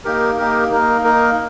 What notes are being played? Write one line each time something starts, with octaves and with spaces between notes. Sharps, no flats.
A#3 D#4 G4 A#4
A#3 D#4 G4 A#4
A#3 D#4 A#4
A#3 D#4 A#4